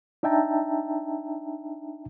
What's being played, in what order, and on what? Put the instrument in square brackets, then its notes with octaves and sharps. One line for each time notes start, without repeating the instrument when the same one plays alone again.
[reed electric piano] D4 D#4 E5 G5 A5 A#5